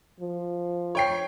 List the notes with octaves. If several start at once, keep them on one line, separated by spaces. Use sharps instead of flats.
F3
C#5 G5 C7